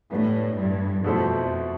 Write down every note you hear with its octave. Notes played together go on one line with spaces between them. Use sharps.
A2 E3 B3 D4 G4 B4
G2
F2 B2 A3 E4 A4 C5